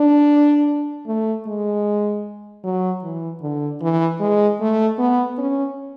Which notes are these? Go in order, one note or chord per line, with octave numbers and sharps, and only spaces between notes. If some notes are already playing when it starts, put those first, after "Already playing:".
Already playing: D4
A3
G#3
F#3
E3
D3
E3
G#3
A3
B3
C#4